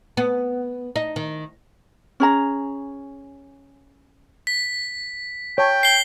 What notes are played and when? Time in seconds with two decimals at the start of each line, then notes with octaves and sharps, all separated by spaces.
0.17 B3
0.96 D#4
1.16 D#3
2.20 C#4 G#4 A#5
4.47 B6
5.58 C#5 G5 A5
5.83 C7 G7